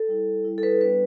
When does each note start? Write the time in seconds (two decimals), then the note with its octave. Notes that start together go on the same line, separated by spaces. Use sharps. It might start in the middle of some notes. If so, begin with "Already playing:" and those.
Already playing: A4
0.08 G3 E4
0.45 G3 E4
0.58 A4
0.63 B4
0.81 G3 B3 D4 B4